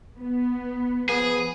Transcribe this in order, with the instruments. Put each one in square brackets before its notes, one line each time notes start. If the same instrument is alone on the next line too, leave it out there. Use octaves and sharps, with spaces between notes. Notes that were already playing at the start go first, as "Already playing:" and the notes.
[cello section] B3
[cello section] F3 [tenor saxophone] B3 [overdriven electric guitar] G#4